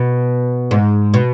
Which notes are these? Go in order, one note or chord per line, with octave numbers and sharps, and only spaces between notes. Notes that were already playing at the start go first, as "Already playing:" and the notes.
Already playing: B2
G#2
B2